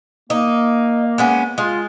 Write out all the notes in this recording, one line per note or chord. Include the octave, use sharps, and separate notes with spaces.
A#3 D#4
G#3 B3 C#4
G#3 F4